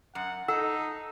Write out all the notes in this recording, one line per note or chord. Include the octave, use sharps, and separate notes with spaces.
F#2 F#5
D#4 A4 F#5 E6